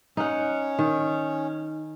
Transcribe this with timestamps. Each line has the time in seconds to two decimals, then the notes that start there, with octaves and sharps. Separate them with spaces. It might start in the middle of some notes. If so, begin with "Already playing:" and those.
0.17 C#4 D#4 F#5
0.79 D#3